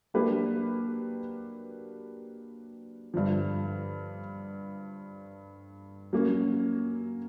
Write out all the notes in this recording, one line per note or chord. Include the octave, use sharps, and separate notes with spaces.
F#3 A#3 D4 G4 B4
G2 D3 F3
F#3 A#3 C#4